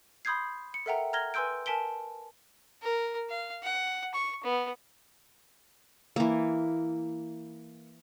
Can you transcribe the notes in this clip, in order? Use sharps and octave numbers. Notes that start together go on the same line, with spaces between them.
B5 C6 D#6 G6 G#6 C7
C#7
A4 A#4 E5 F#5 G5 A#5
A#5 F6 G#6 A#6 G7
B4 G#5 C6 E6 G6 D7
A#4 G#5 A5 B6 D7 G7
A#4
F5
F#5
C#6
B3
E3 A#3